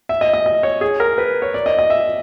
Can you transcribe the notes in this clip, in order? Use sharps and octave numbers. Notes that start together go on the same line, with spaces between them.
E5
D#5
D#5
D#5
C#5
G#4
A#4
B4
C#5
D5
D#5
D#5
E5